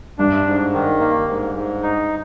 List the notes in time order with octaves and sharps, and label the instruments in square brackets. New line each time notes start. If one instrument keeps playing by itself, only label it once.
[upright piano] G2 [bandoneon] D4
[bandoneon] G#2
D#3
A#3
G#2
G#2
D#4